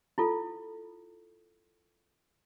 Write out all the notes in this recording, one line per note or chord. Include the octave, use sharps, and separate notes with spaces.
E4 F4 A4